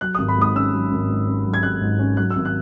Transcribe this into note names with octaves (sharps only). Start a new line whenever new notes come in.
F#3 F#6
D#6
G#1
B5
G#2 D#6
C#4 E6
F#3
G#1
G#2
C#4
F#3
G#6
G#1 F#6
G#2
C#4
F#3 F#6
E6
G#1
F#6